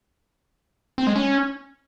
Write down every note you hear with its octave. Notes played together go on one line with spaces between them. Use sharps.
C4
G#3
C#4